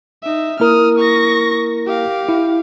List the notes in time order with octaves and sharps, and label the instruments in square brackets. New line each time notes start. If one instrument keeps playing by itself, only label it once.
[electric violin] D#4 E5
[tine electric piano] A#3 E4 A#4 [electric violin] D#6 F6
[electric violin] C#6 A#6
G4 F5
[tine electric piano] E4